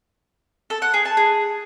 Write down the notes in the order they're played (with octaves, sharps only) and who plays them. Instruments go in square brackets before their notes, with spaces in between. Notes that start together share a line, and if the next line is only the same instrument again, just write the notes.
[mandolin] A4
F#5
G#4
A5
G#4